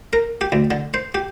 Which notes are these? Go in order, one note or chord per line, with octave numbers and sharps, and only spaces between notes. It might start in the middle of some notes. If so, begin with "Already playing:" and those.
A#4
G4
D2
D3
C5
G4